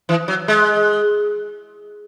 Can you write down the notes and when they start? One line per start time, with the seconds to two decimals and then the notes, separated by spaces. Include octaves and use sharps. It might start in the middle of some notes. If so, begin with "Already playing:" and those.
0.09 E3
0.28 F#3
0.48 G#3